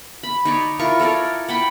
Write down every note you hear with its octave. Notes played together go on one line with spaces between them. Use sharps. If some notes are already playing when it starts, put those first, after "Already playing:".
B5
D#4 C#5 D5
E4 F4 A#4 C#6
A4 A#4 C#5 D5
F#5 G5 B5